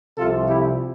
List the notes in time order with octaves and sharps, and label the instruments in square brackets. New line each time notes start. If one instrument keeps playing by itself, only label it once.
[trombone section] C2 C3 F3 F4 A4
E4 G4